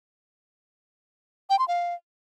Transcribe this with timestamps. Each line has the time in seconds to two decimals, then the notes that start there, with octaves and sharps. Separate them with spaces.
1.50 G5
1.59 C6
1.68 F5